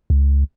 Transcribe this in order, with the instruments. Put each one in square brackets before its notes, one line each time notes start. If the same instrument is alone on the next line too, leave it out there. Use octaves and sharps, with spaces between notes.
[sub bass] C#2